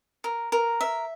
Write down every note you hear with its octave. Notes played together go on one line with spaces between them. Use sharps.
A#4
A#4
E5